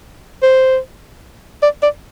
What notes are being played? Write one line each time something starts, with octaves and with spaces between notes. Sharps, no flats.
C5
D5
D5